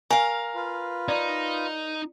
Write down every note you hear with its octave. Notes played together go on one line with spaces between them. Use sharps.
A#4 F5 G#5 C#6
F4 B4
D#4 D5 C#6